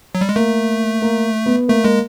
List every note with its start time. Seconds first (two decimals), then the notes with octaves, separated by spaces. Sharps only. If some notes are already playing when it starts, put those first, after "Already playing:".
0.15 F#3
0.21 G3
0.29 G#3
0.36 A3 A#3
1.02 A#3
1.46 B3
1.68 A3 A#3
1.84 G#3 A#3